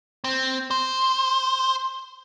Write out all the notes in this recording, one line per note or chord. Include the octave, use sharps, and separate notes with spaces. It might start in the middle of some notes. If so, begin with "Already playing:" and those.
C4
C5